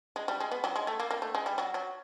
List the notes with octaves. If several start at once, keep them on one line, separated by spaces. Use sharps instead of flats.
G#3
G3
G#3
B3
F#3
G#3
A3
A#3
A#3
A3
G#3
G3
F#3
F#3